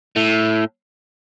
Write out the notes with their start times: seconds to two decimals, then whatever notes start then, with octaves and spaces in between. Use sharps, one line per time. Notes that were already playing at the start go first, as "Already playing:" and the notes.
0.16 A2